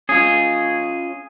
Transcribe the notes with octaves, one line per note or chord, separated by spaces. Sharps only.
C#4 F4 G#4